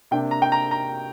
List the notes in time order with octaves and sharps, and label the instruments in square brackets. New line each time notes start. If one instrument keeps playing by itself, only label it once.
[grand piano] C3 A#3 D4 G5
A#5
G5
A#5
A#5